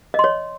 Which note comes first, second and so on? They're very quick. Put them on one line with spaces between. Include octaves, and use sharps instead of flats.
D#5 C6 C#5